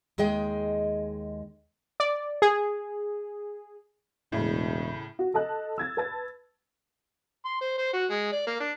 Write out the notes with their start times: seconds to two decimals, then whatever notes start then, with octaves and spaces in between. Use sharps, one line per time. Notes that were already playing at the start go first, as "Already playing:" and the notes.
0.18 D#2 G#3 G#4 D#5 G5
2.00 D5
2.42 G#4
4.32 E1 A2 C#3
5.19 F#4
5.34 A4 D#5 A5 F#6
5.78 E6 G#6 A6
5.97 B4 A5 A6
7.45 C6
7.61 C5
7.78 C5
7.93 F#4
8.10 G#3
8.32 D5
8.47 A#3
8.60 D4